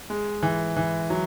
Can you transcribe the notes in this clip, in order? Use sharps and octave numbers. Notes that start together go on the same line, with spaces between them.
G#3
E3
E3
F#3